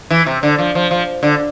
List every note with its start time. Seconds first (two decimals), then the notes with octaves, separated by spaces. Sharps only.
0.10 E3
0.26 C3
0.43 D3
0.59 F3
0.75 F3
0.91 F3
1.23 D3